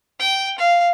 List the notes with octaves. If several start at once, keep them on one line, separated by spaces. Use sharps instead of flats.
G5
F5